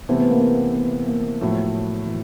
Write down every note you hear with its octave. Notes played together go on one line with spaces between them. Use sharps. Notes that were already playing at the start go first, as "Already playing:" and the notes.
C3 E3 A3 B3 C4
B3
A#3
B3
B3
A#3
A2 F3 F#3 A3
E3